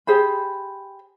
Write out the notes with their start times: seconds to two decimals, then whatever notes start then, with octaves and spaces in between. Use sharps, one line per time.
0.07 G4 G#4 C5 B5